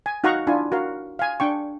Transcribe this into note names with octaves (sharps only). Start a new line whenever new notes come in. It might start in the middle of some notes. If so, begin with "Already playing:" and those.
G#5
D#4 F#4 F5 F#5 A#5 C#6
D4 E4 F4 G#5
F#4 A#4 F5
F5 G#5
D4 G5 C#6